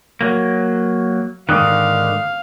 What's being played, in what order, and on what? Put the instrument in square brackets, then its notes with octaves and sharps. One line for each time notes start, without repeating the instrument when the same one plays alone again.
[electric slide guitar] F#3 A#3
[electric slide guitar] G#2 D3 D#3 [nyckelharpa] F5 [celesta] D6 D#6 F#6